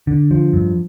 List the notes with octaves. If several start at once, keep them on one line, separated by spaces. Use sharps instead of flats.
D3
F3
G2